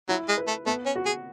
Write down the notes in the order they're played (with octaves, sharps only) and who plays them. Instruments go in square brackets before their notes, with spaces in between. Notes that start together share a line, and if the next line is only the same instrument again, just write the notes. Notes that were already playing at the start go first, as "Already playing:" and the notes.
[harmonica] F#3 [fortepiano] E4
[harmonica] G#3
[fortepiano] B4
[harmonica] A3
[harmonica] A3 [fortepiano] B3
[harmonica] C#4
[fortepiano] F#4
[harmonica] G#4